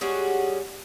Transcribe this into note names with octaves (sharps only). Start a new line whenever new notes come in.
G3 G#3 C#4 F#4